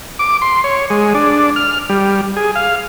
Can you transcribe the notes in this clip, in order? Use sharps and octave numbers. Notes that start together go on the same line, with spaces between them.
D6
C6
C#5
G#3
D4
F6
G3
G#4
F5